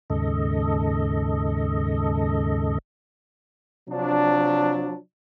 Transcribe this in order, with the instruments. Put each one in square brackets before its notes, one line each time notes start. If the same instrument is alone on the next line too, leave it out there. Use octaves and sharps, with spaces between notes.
[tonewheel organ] D#2 G#2 C#3 A4 D#5
[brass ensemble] C3 F3 F#3 D4